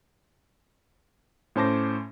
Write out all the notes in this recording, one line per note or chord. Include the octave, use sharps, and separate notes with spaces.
A2 C#4 C5 A5 D6 A#6